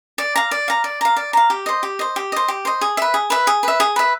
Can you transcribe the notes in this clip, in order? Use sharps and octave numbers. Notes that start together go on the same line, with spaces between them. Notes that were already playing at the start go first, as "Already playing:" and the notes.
D5
F5 A#5
D5
F5 A#5
D5
F5 A#5
D5
F5 A#5
G4
C5 D#5
G4
C5 D#5
G4
C5 D#5
G4
C5 D#5
G#4
B4 E5
G#4
B4 E5
G#4
B4 E5
G#4
B4 E5